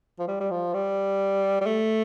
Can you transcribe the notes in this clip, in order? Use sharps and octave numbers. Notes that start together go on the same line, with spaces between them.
F3
G3
G3
F3
G3
G3
A3